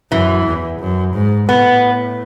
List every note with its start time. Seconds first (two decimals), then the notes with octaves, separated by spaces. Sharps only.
0.11 F#2 E3
0.46 E2
0.80 F#2
1.14 G#2
1.48 A2 B3